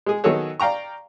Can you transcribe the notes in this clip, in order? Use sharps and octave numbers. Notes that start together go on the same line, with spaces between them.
G#3 G#4
D#3 F#3 B3 G#4 A4 C#5
D5 F5 G5 A#5 C#6